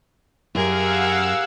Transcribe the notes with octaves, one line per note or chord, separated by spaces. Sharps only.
F#2 G4 G#4 A#4 F5 F#5 E6 G#6